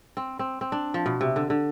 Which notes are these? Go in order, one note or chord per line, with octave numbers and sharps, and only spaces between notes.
C4
C4
C4
D4
F3
B2
C3
D3
D3